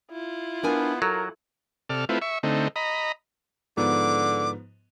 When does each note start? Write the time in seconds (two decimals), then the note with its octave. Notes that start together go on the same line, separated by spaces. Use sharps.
0.11 E4 F4
0.64 B3 D4 A#4 G#5
1.02 F#3 A4 A#4
1.89 C3 A4 D5 F6
2.09 A3 C4 E4 F4 B4
2.22 E5 C#6
2.43 D3 A3 C4 D#4
2.76 D#5 A#5 B5
3.77 G#2 D3 F3 B3 D6